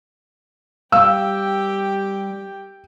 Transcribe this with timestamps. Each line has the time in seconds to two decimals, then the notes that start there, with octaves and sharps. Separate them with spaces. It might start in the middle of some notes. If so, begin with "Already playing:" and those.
0.92 G3 G4 F5 G5 E6